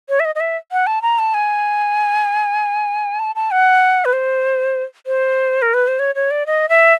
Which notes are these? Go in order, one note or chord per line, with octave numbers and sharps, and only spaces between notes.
C#5
E5
D#5
D#5
E5
F#5
A5
A#5
A5
G#5
A5
A5
F#5
B4
C5
C5
A#4
B4
C5
C#5
C#5
D5
D#5
E5